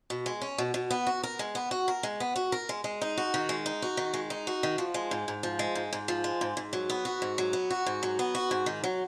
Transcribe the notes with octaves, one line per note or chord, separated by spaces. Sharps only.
B2
G#3
C#4
B2
B2
B3
F#4
A#4
G#3
B3
F#4
A#4
G#3
B3
F#4
A#4
G#3
G#3
D#4
F#4
D#3
G#3
D#4
F#4
D#3
G#3
D#4
F#4
D#3
F3
G#3
G#2
G#2
F3
G#3
G#2
G#2
F3
G#3
G#2
G#2
F#3
B3
F#4
G#2
F#3
B3
F#4
G#2
F#3
B3
F#4
G#2
D#3
F#3